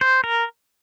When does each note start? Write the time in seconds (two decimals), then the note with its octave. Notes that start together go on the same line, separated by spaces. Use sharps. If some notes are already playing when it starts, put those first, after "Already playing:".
0.01 C5
0.24 A#4